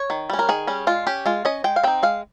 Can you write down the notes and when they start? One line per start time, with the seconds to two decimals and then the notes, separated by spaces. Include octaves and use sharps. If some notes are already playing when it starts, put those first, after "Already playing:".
Already playing: C#5
0.10 D#3
0.30 G3 C#4
0.39 A#4
0.49 D#3 G#4
0.67 G3 C#4
0.87 G#3 F4
1.07 C#4 G4
1.26 G#3 F4
1.45 C#4 D#5
1.64 G#3 G5
1.76 F5
1.83 C4 D#4 G5
2.03 G#3 F5